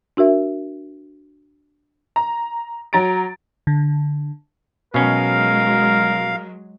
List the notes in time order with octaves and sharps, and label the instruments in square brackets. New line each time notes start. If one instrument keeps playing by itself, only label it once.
[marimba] D4 F#4 A#4 E5
[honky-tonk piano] A#5
F#3 A#5 A6 D7
[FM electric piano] D3
[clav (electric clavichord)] B2 C#4 [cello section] F#3 G#3 [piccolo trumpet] A#4 [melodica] F5